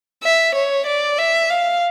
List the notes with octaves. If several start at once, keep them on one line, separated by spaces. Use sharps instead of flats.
E5
C#5
D5
E5
F5